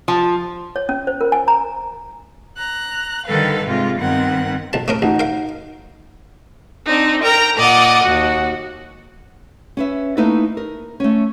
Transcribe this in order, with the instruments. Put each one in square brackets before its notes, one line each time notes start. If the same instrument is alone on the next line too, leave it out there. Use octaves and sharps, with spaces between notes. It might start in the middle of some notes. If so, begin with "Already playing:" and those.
[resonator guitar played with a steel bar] F3
[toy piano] C#5
C#4
C5
A#4
G#5
A#5
[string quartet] A#5 F#6
D3 D#3 G3 A4 B4 F5
G#2 C3 G#3 F4
G2 D#3 B3 C4 F#5
[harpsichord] B1 A5
A3 C#4 A#4
[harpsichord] A1 [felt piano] D#4 F#4
[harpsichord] A#4 F5
[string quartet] C4 D4 D#4
A#4 G5 A#5
A#2 D5 D#5 F#5
D#2 F#4
[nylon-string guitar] C#4 B4 E5
A3 A#3 D#4 E4 A4 B4
A#4
A3 C#4